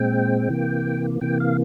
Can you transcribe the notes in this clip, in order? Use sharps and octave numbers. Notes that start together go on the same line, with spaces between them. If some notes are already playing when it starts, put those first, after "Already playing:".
Already playing: A#2 G#3 C4 G5
C3 E3 A#3
C3 E3 A#3 G5
F5